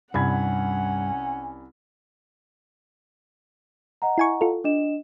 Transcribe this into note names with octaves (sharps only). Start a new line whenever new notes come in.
C2 G2 C#4 F#5 B5 G#6
D#5 F#5 A#5
E4 G#5 C#6
F4 A4
D4 D#5 E7